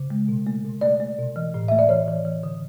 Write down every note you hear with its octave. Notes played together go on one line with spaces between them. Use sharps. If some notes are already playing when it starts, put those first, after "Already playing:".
Already playing: C#3
G#3
B2
A3
B2
A3 D5
A3
B2
E3
A2
A3 E5
D5
E3 C#5
E3
E3
D3